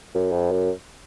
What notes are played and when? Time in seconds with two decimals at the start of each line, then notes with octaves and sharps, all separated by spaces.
0.14 F#2
0.32 F2
0.51 F#2